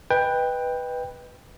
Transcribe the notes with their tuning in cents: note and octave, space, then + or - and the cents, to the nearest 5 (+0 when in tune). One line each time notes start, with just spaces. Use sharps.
B4 +0 D#5 +0 G5 +15